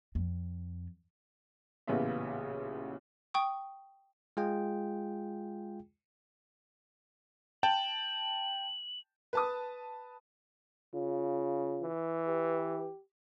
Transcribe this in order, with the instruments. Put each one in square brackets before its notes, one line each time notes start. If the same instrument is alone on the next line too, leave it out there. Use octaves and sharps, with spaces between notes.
[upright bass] F2
[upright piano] A1 A#2 C#3 B3 F4 E5
[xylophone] G5 C#6 D#6
[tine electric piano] G#3 F4 G#4 G5
[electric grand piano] G5 A5 [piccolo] F#7
[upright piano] B4 A5 D#6
[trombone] C#3 [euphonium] F4
[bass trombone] E3
[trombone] G4 [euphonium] B4